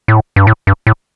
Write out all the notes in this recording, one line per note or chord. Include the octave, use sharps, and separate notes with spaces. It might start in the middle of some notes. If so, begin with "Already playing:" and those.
A2
G2
A2
G2
A2